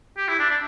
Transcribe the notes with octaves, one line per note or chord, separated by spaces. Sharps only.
G4
E4
D4
D4